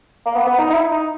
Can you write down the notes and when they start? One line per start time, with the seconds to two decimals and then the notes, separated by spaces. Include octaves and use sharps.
0.26 A#3
0.36 B3
0.47 B3
0.59 D#4
0.70 D#4
0.74 E4
0.91 D#4